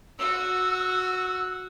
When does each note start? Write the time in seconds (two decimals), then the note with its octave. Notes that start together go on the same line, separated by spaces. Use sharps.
0.19 F#4 E6